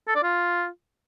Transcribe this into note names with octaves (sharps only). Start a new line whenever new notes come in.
A4
D5
F4